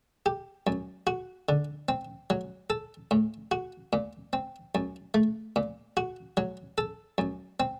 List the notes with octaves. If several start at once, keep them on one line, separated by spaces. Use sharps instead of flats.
G4
F#2
F#4
D3
C4
F#3
A4
A2
F#4
A#2
C4
F#2
A3
A#2
F#4
F#3
A4
F#2
C4